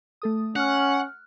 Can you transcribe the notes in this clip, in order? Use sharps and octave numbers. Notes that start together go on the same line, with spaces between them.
A3 A4 D#6
C#4 F#5 F6 F#6